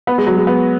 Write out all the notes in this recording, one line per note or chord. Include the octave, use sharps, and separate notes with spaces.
B3
G#3
F#3
G#3
B3